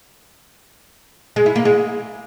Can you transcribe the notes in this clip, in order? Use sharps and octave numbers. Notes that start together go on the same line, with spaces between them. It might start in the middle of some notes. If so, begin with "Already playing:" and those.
G#3
E4
A#3
G#3